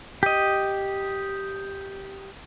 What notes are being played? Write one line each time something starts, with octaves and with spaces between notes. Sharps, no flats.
G4 D#5